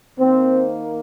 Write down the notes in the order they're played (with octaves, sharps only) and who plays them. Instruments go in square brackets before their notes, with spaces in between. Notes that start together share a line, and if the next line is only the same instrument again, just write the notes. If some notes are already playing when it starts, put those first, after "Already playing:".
[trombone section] D#3 A#3 C4